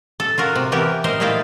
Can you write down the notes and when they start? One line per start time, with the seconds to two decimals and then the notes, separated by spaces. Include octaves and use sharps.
0.20 A4
0.38 F4 F#4 A#4
0.55 C3
0.72 E3 B3 G4 A#4
1.04 A#4 C5 D#5
1.20 A#2 A3 D#4 E4 F5 G5